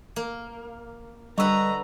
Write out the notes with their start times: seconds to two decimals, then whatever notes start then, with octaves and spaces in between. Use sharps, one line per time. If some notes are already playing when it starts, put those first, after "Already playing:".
0.16 A#3
1.38 D3 G3 B4 D#5 A#5 C#6 E6